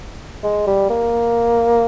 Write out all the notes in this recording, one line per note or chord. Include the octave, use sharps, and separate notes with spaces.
G#3
G3
A#3